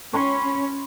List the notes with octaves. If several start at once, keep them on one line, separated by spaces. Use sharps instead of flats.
C#4 C#5 B5 C6